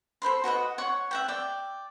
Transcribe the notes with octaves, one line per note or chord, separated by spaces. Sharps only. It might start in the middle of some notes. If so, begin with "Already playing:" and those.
A4 C5 B5 C6
F#4 B4 D#5 F#5
C#5 F#5 C6 C#6
E5 F#5 G5
D5 G5